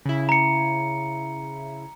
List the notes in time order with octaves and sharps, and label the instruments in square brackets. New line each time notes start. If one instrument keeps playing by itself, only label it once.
[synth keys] C#3 E4
[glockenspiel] A#5 C#7